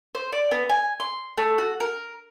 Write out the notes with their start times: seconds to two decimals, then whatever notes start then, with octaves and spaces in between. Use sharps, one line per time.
0.15 C5
0.32 D5
0.51 B3
0.69 G#5
1.00 C6
1.38 A3
1.58 F#4
1.80 A#4